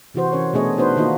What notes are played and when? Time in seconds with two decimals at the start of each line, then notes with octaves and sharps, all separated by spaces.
0.14 C3 E3 F#4 C5
0.33 E3 C#4 A#4 C#5
0.53 B2 A3 D4 G#4 C#5 D#5
0.78 B3 D4 D#4 F#4 B4 C5
0.97 D#3 A#3 D#4 F4 F#4 D#5